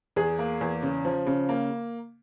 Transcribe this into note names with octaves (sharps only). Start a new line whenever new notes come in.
E2 G#4
A#3
E2
C#3
F3
C#3
A#3